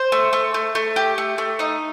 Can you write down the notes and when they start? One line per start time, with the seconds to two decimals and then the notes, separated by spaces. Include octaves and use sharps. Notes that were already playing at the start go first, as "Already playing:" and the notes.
Already playing: C5
0.12 A3
0.33 A3
0.54 A3
0.75 A3
0.96 G4
1.18 A3
1.38 A3
1.59 D#4 D#5